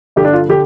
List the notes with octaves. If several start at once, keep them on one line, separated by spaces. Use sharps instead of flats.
G2 D3 G4
D4
F4
D3 G4